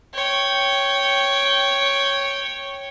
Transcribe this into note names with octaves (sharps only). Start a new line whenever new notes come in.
C#5 G5